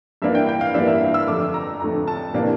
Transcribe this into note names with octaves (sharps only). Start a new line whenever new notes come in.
G2 E3 A#3 D4 E5
G5
G5
F5
G2 E3 A#3 D4 E5
E5
F5
E6
F2 D3 A3 D6
A#5
F2 D3 A3 A#5
A5
C3 E3 A#3 D4